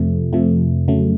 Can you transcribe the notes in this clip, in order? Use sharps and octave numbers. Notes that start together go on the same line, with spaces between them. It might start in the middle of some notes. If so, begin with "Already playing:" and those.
Already playing: F2 C3 F3 A3
F2 C3 F3 A3
F2 C#3 F#3 A3